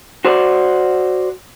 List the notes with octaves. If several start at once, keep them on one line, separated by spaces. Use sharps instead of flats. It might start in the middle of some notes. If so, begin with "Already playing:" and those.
F#4 C5 D5